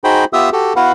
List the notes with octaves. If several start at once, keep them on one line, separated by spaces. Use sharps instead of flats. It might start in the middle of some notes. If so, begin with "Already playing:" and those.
D#4 F#4 G#4 C5 G5 B5
B3 F4 G4 E5 D#6 E6
F#4 G4 A4
B3 E4 F#4 B4 F5 F#5